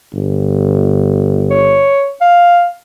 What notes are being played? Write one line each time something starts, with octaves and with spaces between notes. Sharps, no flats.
G1
C#5
F5